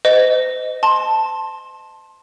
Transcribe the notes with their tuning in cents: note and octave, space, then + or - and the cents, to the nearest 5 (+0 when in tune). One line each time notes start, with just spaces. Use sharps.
C5 -40 D#5 +0
A5 +0 C6 +20